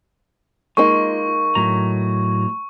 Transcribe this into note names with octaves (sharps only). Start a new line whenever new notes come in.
G#3 A#3 D#4 F4 C#6
A2 F#3 A#5